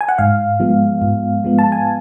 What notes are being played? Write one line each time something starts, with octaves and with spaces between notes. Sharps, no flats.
G#5
F#5
G#2 F5
F3 G#3 B3
G#2
F3 G#3 B3
A5
G#5